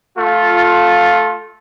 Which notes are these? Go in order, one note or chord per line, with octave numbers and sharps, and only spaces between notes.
A3 F4